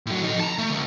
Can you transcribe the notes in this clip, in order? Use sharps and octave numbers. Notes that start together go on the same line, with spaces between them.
A2 F#3
F2 D#4
A5 A#5
A3
C#2